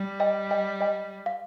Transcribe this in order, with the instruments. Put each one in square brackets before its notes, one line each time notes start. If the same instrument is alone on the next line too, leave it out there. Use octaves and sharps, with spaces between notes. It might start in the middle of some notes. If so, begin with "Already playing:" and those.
Already playing: [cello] G3
[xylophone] D#5 G5
D#5 G5
D#5 G5
F5